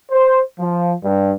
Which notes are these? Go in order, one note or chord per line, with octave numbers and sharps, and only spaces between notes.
C5
F3
G2